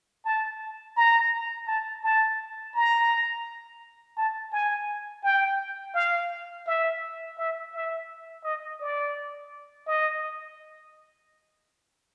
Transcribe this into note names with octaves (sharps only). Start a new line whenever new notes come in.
A5
A#5
A5
A5
A#5
A5
G#5
G5
F5
E5
E5
E5
D#5
D5
D#5